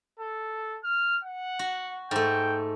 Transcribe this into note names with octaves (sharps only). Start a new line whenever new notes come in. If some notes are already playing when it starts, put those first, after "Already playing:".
A4
F6
F#5
F#4
G#2 A3 G5